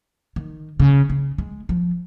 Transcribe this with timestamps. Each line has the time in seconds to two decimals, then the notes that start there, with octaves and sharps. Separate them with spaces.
0.36 D#3
0.80 C#3
1.09 C#3
1.38 G#3
1.69 F3